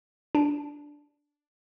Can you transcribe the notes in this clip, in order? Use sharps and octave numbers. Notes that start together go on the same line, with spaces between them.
D4